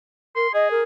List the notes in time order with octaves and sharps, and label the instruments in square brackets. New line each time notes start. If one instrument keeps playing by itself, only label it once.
[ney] A#4 [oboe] C6
[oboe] G#4 [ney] D#5
[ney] A#4